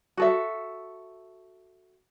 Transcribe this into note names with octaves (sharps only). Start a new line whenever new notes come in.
F#4 A4 E5